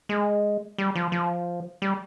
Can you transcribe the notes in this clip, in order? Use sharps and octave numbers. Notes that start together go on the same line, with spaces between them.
G#3
G3
F3
F3
G3